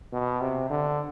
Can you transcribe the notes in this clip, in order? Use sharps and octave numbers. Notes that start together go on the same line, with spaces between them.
B2
C3
D3